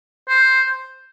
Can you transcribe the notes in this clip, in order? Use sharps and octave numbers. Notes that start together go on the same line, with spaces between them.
C5